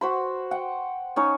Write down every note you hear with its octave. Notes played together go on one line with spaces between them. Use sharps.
F#4 C5 B5
F#5 G5
C#4 D#4 C#5